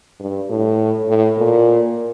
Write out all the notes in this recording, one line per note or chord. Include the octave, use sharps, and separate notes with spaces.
G2
A2
A2
A#2